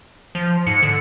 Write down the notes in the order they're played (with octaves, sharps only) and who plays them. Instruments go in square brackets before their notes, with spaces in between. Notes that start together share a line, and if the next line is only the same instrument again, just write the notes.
[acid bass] F3
[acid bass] G#2 [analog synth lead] C#7
[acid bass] D3